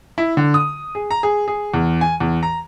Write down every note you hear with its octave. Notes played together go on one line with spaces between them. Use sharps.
E4
D3
D#6
G#4
A#5
G#4
G#4
E2
G#5
E2
A#5